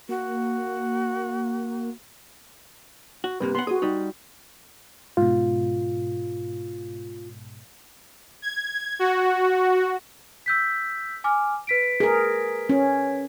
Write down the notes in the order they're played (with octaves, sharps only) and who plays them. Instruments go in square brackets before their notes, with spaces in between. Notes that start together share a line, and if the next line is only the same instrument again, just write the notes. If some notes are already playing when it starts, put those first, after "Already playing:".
[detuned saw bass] A#3 [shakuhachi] F#4
[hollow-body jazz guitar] F#4
[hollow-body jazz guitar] G2 C3 A#3 [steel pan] B4
[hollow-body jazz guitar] B3 F#5 [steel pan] C6
[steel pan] F#4 D#6 [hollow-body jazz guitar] G#4
[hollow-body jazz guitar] G3 D#4
[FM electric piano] G#2 B2 [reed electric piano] F4
[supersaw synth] G#6
F#4
[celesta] E6 G6 B6
G#5 D6 F6
B4 B6 D7
[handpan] G#4 A#4
C#4